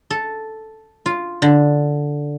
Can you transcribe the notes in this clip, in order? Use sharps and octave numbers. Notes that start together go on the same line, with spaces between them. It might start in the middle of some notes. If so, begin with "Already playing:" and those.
A4
F4
D3